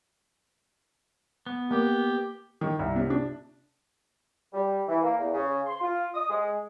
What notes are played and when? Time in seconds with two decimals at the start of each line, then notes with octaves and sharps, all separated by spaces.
1.46 B3
1.71 A#3 G4
2.61 D#3
2.79 C2
2.96 C3
3.10 D4
4.53 G3
4.88 E3
5.03 A#3
5.18 E2
5.33 C#3
5.67 C6
5.81 F4
6.14 D#6
6.30 G#3